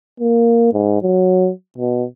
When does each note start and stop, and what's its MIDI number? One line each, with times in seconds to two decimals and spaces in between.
0.20 0.73 58
0.73 0.99 44
1.02 1.51 54
1.78 2.05 47